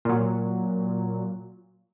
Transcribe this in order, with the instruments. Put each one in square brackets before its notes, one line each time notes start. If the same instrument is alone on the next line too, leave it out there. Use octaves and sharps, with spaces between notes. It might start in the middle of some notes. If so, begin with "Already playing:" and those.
[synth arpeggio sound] A#2 F#3